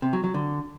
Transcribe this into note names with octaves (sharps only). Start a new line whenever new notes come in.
C3
F#3
F#3
D3